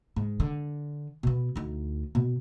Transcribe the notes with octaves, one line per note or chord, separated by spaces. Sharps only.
G#2
D3
B2 B3
D2 D#4
B2